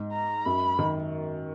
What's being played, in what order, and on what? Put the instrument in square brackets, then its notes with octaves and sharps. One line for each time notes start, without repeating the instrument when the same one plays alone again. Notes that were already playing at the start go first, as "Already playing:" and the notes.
Already playing: [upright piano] G#2
[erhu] A#5
[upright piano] F#2 [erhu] B5
[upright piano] D#3